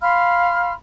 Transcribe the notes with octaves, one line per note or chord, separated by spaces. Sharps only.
F5 B5 C6 F6